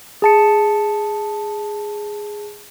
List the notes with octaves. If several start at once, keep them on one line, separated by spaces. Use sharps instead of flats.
G#4 A5 C#7